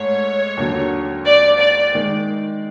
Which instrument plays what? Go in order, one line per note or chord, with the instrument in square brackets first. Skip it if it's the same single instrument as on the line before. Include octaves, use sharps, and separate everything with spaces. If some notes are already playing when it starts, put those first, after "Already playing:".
Already playing: [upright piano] G#2 A3 [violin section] C#5
[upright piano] D#2 D3 F#3
[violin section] D5
D5
[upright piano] D#3 G#3